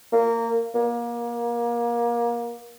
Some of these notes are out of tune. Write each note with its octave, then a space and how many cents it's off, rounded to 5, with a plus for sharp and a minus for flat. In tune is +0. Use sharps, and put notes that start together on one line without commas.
A#3 -20
A#3 +25